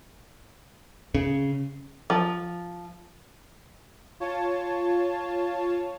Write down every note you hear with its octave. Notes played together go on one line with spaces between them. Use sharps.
C#3
F3
F4 C#5 A5